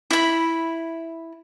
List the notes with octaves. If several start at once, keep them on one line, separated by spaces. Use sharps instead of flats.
E4 B5